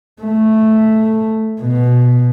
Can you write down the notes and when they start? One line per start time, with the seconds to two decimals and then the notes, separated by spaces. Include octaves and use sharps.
0.22 A3
1.62 B2